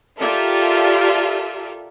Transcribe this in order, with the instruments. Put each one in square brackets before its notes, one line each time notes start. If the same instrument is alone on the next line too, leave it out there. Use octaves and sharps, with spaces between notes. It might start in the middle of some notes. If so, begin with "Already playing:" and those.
[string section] F4 G4 A4 A#4 D5 E5